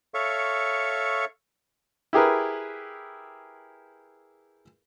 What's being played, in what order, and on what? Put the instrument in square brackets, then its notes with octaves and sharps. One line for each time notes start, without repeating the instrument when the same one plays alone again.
[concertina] A4 C#5 E5 F5 C#6
[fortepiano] E4 G4 G#4 A#4 B4